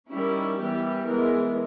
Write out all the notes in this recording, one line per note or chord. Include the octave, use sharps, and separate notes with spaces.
D#3 G3 C#4 E4
E3 G3 B3 G4
E3 G#3 B3 A#4